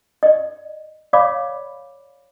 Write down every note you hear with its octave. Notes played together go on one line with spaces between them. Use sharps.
D5 D#5
C#5 D5 F5 B5 D6